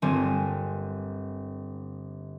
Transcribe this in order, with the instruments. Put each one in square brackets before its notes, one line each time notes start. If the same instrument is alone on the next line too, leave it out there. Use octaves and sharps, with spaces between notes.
[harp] G1 G3 A#3 C4 G#5